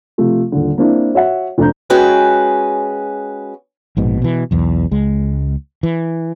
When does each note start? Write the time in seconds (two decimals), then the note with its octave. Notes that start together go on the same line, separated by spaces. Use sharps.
0.18 C3 F3 A3 F4
0.52 D#1 D3
0.78 A#3 C4 D4 E4
1.14 F#4 C#5 E5 F#5
1.58 F1 C4 D4 A#5 G6
1.90 G#3 C#4 F#4 G#4 B4 G5
3.97 A#1 G#2 B2
4.22 B2 E3
4.51 B1 E2
4.91 C#2 G#3
5.83 E3